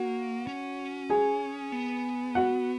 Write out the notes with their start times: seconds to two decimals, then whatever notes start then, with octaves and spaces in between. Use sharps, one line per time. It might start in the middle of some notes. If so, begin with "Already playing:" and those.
Already playing: A#3 F#4
0.47 C#4
1.10 G#4 G#5
1.72 B3
2.35 F#4 F#5